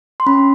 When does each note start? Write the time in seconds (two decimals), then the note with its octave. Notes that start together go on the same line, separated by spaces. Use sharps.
0.20 C6
0.26 C#4 B5